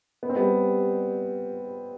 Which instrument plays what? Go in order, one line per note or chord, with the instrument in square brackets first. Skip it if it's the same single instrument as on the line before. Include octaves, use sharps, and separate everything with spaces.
[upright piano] B3
C4
G3 B3